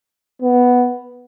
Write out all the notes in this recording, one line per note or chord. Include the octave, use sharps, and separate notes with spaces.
B3